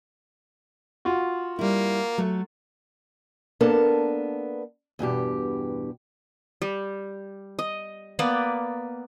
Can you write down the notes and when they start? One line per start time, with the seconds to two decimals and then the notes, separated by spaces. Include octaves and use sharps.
1.05 F4 F#4
1.59 G3 A#3 E4
2.18 F#3 A3
3.61 A#3 B3 D4 A4 A#4 A5
4.99 E2 G2 B2 G4
6.62 G3
7.59 D#5
8.19 A#3 B3 B4 D5